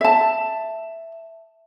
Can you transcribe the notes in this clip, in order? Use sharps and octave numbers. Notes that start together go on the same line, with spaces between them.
E5 A5